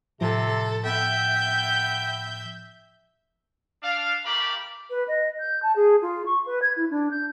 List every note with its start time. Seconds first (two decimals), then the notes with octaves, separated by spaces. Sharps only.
0.21 A2 C3 F3 A4
0.85 B3 E5 G5 G6
3.83 D4 F5
4.25 A3 G4 A#4 D5 F5 B5
4.90 B4
5.08 D#5
5.39 G6
5.62 A5
5.75 G#4
6.02 F4
6.25 C#6
6.46 B4
6.62 G#6
6.76 E4
6.90 D4
7.11 G6